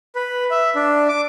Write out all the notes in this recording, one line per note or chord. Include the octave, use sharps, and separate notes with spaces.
B4
E5
D4
D6